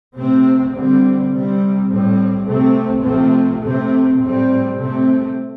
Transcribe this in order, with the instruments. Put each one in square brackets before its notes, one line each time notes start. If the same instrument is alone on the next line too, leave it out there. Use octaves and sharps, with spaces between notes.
[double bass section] C3 A3 C4
D3 G3 C4
C3 G3 C4
A2 G3 C4
C3 A3 C4
C3 F3 A3 C4
C3 A3 C4
A2 G3 C4
C3 A3 C4